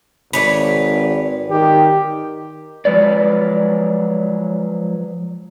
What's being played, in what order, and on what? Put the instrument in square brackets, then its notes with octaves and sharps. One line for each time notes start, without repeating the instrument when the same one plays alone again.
[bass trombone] G#1 [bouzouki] B4 C#5 D5
[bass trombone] D#3 [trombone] G4
[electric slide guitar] F3 F#3 G#3 B4 D5